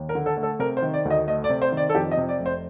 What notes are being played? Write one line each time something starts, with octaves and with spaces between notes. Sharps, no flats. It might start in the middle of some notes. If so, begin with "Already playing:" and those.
Already playing: D#2
A#4
D3
A4
A3
A4
C3 A#4
C5
D#3
D5
D2
D#5
A3 D#5
D5
C3
C5
D#3
D5
A4
F2 G4
D#5
C3
D5
F1
C5